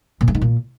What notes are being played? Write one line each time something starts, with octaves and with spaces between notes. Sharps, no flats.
A#2
G2
D#3
A#2